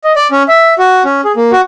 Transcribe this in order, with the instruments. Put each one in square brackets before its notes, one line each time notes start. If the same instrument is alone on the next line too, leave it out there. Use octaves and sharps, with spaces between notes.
[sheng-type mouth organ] D#5
D5
C#4
E5
F#4
C#4
G#4
A#3
F#4